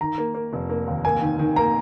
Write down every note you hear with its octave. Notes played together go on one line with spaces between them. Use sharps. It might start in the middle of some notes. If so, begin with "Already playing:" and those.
D#3 A#5
A#3
A#3
F1
A#3
D#2
A#3 G#5
D#3
D#3
A#3 A#5